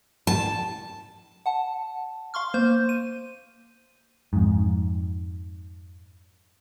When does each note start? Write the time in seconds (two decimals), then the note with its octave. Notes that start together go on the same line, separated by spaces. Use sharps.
0.27 A5
1.46 F#5 A5
2.34 F5 C6 C#6 F6
2.54 A#3 C5 G6
2.89 D#7
4.33 F2 G#2